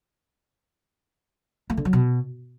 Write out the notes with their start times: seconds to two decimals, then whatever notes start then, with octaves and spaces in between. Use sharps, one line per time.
1.70 A3
1.77 D3
1.85 F#3
1.93 B2